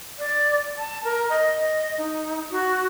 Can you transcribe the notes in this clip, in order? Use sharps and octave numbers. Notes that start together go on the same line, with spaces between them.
D5
A5
A#4
D#5
D#5
D#4
F#4